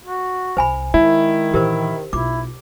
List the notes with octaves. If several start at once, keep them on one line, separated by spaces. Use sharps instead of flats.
F#4
C2 C5 G#5 B5
D#3 G#3 E4
A#2 E3 G4 A#4 C5
B1 E4 F4 D6